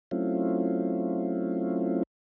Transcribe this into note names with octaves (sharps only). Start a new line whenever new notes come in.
F#3 A3 C4 C#4 E4 F4